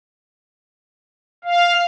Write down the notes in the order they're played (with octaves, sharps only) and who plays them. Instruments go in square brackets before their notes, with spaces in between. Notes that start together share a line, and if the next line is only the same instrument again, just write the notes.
[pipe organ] F5